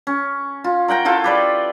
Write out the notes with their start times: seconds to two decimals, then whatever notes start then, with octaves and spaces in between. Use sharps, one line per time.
0.07 C#4
0.64 F4
0.88 A#4 F#5 G5 A#5
1.05 E4 F4 A4 G5
1.24 G4 B4 D5